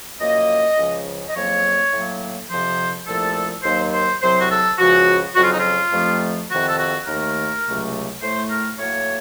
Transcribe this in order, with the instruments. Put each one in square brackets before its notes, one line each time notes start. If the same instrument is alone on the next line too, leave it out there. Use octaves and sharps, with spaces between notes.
[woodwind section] F#2 F3 A#3 D#5
C#2 C#3 F3
D#5
F2 C#3 F#3 A#3 C#5
A2 F#3 A#3
F2 C3 F3 C5
C2 A#2 F3 A3 A4
D#2 D#3 F#3 A#3 C5
C5
C2 C3 F#3 C5
F#4
A4
C#2 C#3 F3 F#4
F2 C#3 F#3 F#4
F4
D#4
F4
F2 C3 F3 A3
F2 C3 D#3 F#4
A4
F#4
D#2 D#3 A3 A#4
C#2 C3 F#3 A3
A2 A3 C5
A#4
A2 F#3 A#3 C#5